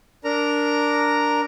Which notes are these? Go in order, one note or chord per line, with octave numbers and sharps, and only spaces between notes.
D4 A#4 A#5